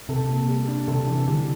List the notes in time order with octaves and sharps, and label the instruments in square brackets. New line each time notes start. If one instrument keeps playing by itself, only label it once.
[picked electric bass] C3 [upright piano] A4
[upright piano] A#2
G3
D4
[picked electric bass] C3 [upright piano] A4
[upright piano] E3
[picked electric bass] D3 [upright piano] G3